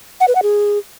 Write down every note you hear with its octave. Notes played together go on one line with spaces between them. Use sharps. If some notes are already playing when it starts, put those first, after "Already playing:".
F#5
B4
F#5
G#4